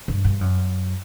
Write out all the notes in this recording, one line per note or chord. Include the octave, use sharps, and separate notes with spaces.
G2
G2
F#2